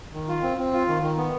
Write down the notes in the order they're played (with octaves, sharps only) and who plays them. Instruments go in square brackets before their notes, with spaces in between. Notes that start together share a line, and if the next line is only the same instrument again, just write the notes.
[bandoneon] D#3
F4
C4
C4
F4
D#3
D#3
B3